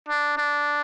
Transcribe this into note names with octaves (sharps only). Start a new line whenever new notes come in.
D4
D4